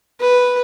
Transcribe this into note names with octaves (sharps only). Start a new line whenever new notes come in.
B4